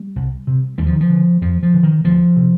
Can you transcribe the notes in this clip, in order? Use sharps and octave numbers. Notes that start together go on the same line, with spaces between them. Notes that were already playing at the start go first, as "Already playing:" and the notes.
Already playing: G3
C2
C3
D#2 G3
F3
D#3
F3
D3
F2 F3
F3
D3
D#3
D2 F3
C3